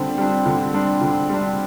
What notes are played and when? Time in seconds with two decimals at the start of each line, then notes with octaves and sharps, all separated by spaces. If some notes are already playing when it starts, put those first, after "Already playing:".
Already playing: D3 G3 C4 D4
0.18 G3 D4
0.46 D3
0.74 G3 D4
1.01 D3
1.29 G3 D4